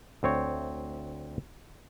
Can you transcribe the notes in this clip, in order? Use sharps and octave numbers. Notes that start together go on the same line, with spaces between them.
D2 C4 C#5